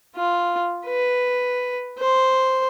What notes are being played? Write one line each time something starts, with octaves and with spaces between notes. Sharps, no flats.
F4
B4
C5